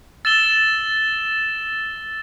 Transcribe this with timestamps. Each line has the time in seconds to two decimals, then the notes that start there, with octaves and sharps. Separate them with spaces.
0.25 E6 A6 E7 G7